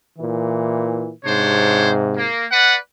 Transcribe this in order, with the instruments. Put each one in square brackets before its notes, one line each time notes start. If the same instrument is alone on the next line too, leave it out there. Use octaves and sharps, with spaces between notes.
[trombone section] A#2 E3
[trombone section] G#2 C3 [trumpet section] D4 C5 C#5
[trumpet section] A#3
B4 D5 F#5